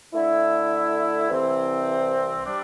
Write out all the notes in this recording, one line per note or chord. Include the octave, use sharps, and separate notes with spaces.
D3 A3 E4
C2 C3 E3 C4
G3 D4